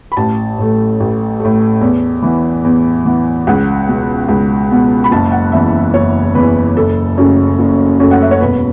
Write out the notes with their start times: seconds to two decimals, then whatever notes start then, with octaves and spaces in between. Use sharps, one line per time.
0.12 B5
0.17 A1 A5
0.58 A2 A3
1.00 A1
1.40 A2 A3
1.81 E2
2.22 E3 B3
2.64 E2
3.05 E3 B3
3.47 C#2 F#5
3.88 B2 B3
4.29 C#2
4.71 B2 B3
5.04 B5
5.11 F#1 A5
5.32 F#5
5.52 E2 E3 E5
5.94 F#1 C#5
6.35 E2 E3 B4
6.76 F#1 A4
7.17 F#2 C#3 A3
7.59 F#1
8.00 F#2 C#3 A3
8.11 F#5
8.22 E5
8.31 C#5
8.40 E1 B4